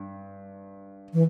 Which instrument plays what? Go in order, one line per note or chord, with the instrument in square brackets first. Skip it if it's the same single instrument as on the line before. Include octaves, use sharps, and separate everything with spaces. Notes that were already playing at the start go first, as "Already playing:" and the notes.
Already playing: [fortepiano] G2
[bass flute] E3